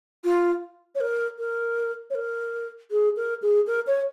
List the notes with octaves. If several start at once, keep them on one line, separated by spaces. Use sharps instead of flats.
F4
C#5
A#4
A#4
C#5
A#4
G#4
A#4
G#4
A#4
C#5